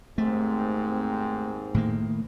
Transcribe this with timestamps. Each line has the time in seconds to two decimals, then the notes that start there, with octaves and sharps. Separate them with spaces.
0.18 D#2 G#2 A3 C4
1.74 A2 D#3 A#3